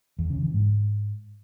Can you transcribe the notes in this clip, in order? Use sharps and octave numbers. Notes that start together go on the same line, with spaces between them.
E2
C#3
E3
G#2